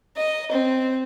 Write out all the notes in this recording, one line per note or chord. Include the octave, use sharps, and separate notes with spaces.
D#5
C4